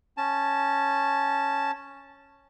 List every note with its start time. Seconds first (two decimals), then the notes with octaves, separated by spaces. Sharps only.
0.17 C#4 A5